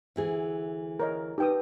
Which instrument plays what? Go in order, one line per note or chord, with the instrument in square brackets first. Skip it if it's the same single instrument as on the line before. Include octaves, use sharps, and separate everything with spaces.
[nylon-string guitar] D2 E3 G#4
[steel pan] A#4 C#5 D#5
[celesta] D#4 B4 [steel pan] G4 G5 D#6